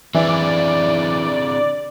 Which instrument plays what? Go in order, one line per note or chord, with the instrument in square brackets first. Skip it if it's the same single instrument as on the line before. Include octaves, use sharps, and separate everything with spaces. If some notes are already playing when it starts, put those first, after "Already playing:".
[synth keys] E3 [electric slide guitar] C4 D4 G#4 [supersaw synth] D5